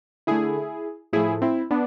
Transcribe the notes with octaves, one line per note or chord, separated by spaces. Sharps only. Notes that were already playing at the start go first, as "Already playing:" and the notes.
D3 A3 E4 G#4
A2 F3 A3 E4 G#4
C4 E4
B3 D4